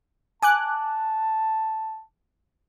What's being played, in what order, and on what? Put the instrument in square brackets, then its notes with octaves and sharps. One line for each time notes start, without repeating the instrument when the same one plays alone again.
[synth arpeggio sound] G#5 D6 F#6 [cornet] A5